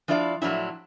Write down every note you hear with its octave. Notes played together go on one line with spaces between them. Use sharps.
F3 D4 E4 F4 D5 F5
A2 F3 F#3 D4 E4